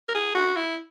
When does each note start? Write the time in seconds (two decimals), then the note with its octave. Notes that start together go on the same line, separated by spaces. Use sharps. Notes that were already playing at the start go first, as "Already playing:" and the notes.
0.09 A#4
0.15 G#4
0.35 F#4
0.56 E4